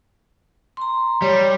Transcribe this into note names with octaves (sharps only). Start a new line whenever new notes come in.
A#5 C6
G3 C#5